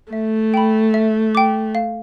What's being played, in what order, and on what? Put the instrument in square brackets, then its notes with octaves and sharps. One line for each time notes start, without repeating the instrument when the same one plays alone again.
[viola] A3 [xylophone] E5
[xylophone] G5 B5
E5
G5 D6
F5